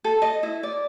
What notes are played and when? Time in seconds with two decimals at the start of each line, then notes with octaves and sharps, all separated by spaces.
0.04 A4
0.22 D#5
0.43 E4
0.63 D5